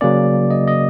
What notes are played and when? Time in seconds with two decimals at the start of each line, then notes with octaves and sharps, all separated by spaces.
0.01 C#3 F#3 A#3 C#4 D5
0.51 D#5
0.68 D#5